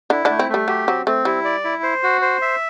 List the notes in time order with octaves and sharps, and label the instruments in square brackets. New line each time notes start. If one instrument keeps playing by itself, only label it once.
[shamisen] D3 D4 [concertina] E4
[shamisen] D3 D4 [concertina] A3
[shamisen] C4
[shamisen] G3 [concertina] A3
[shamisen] F#3 [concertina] G4
[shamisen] F#3 [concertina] C4
[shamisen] A3 [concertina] C4
[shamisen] G3 [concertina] E4
[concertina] D5
E4
C5
F#4
C5
E5